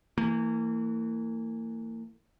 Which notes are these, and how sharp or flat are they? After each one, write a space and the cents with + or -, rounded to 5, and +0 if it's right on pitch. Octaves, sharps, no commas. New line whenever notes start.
E3 +0 A#3 -40